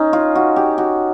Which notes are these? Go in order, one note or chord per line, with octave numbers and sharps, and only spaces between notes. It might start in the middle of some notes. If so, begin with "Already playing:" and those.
Already playing: C#4 D#4
F4
F#4
G4
F#4